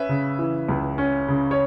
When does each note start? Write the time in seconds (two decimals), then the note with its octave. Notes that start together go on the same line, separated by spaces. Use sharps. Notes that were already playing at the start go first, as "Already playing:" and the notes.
Already playing: C#4 B4 E5
0.09 C#3
0.39 E3
0.69 C#2
0.98 C#4
1.28 C#3
1.51 C#5